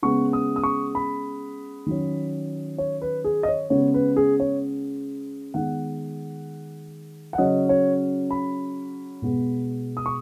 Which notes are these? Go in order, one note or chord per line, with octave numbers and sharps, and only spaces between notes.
C#3 G#3 B3 C#6
D#6
D#6
C#6
B5
D#3 F#3 C#4
C#5
B4
G#4
D#5
C#5
C#3 G#3 B3 C#5
B4
G#4
C#5
D#3 G#3 B3 F#5
F#5
C#3 F#3 C#4 D#5
C#5
B5
B2 G#3 B3
D#6
C#6